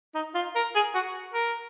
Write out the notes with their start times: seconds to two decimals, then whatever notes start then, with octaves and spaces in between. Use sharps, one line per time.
0.15 D#4
0.35 F4
0.56 A#4
0.75 G#4
0.94 F#4
1.34 A#4